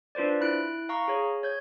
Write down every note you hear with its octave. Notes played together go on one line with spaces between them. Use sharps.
D4 F4 B4 C5 D5
E4 F#6 D7
F5 A#5 C#6
G#4 C#5
C#5 G6 G#6